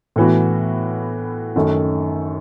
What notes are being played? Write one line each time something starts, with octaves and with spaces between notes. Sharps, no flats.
A2 E3 B3 F#4
F#2 D#3 A3